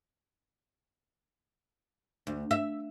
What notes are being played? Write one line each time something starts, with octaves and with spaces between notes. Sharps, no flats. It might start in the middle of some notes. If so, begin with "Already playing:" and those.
D2
E5